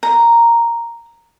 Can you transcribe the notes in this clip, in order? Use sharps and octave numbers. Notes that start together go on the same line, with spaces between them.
A#5